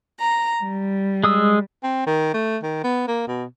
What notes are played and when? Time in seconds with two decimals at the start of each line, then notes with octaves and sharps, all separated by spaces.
0.19 A#5
0.62 G3
1.24 G#3 D#6 E6
1.83 C4
2.07 D#3
2.34 A3
2.63 D#3
2.84 B3
3.08 A#3
3.27 B2